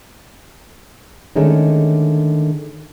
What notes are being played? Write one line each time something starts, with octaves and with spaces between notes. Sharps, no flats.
D3 D#3 G#3 A3 C#4